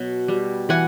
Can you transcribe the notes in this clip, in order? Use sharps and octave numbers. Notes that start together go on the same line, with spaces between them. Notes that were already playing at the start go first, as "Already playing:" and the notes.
Already playing: B2 F#3
G3
E3 F#5 G#5